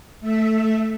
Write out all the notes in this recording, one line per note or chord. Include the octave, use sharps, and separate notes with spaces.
A3 E5